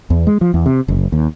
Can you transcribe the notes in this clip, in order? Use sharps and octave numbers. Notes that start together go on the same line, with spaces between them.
E2
G#3
F3
E2
C3
F#1
D#2